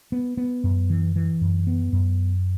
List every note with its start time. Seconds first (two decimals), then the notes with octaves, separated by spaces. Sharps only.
0.12 B3
0.37 B3
0.64 F#2
0.90 E3
1.16 E3
1.41 F#2
1.67 B3
1.93 F#2